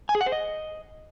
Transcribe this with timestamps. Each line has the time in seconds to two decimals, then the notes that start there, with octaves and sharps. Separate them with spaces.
0.09 G#5
0.15 G#4
0.21 F#5
0.26 C5
0.32 D#5